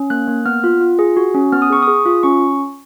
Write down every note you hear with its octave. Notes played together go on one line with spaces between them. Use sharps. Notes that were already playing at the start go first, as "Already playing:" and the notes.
Already playing: C#4
A#3 F#6
A#3
B3 F6
F4
F4
G#4
F#4
C#4
B3 F6
D#6
G#4 C#6
D#6
G#4
F4
C#4 C#6